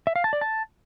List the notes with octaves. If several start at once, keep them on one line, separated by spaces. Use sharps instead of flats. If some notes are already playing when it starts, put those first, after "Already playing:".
E5
F5
A5
D5
A5